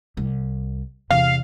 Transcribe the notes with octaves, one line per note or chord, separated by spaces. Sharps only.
C2
E2 C3 F5